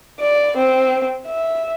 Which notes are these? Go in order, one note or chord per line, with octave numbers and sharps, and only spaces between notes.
D5
C4
E5